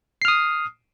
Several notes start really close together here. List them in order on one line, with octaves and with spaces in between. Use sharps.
C7 F6 D#6